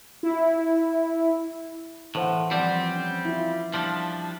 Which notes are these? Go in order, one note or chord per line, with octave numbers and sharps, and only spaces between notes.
E4
A2 E3 C5 F#5
F3 G3 C4 D5 F#5
C#4
E4 F4
F3 G3 D4